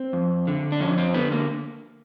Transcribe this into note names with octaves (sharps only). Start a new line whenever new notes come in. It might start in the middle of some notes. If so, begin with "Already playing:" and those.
Already playing: C4
F2
D3
D4
F2 C#4
C4
D3 B3
A#3